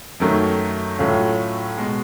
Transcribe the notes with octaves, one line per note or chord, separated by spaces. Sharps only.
F#2 D#3 F#3 A3
A2 F#3 A3 C#4 F4
B2 G#3